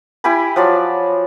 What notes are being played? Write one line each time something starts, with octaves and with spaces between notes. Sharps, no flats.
E4 G4 G#5 B5
F3 F#3 D5